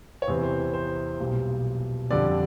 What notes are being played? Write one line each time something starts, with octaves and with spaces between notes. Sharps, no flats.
C#5
E2 C3 E3 C5
C5
C5
B1 A#2 G3
F2 D3 G3 D5